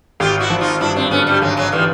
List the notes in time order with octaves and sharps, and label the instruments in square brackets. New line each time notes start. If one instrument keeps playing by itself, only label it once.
[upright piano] G#1 [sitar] F4 G4
[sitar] E4 F#4
[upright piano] F3
[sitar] D#4 F4
[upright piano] G2 [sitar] D4 E4
[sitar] C4 D4
[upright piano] D3 [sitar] B3 C#4
[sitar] G3 A3
[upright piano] G#1 [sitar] F#3 G#3
[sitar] F#3 G#3
[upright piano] E3 [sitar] F3 G3